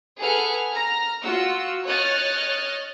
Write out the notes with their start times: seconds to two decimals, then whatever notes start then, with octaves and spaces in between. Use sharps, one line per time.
0.19 G#4 A4 B4 F#5 F6
0.72 A#5 F6 A#6
1.23 F4 F#4 F#5 E6
1.86 C#5 D#5 F6 F#6 A6